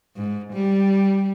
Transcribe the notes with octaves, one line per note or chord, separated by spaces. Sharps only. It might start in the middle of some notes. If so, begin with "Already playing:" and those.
G#2
G3